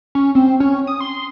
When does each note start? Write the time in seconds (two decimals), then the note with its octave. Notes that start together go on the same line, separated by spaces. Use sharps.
0.15 C#4
0.35 C4
0.60 C#4
0.87 D#6
1.01 C6